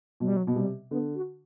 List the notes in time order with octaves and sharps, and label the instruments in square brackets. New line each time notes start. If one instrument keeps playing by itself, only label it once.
[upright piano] B2 [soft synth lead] F#3
[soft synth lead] G3
F#3
[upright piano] B2
[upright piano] C3 [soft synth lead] G3
[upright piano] D3 [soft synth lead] B3
[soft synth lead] F#4